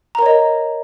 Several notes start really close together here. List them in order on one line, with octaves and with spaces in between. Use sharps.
A#5 A#4 C#5 D#5